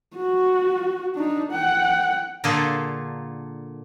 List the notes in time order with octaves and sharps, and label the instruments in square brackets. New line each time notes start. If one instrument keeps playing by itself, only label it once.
[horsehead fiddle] F#4
D4 D#4
F#5 G5
[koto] A#2 D3 A#3 F4 G#4 A4